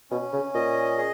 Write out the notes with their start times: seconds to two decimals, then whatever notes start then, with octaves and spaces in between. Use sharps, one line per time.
0.10 B2 C#4
0.33 C#3
0.54 A#2 D#5
0.98 G#4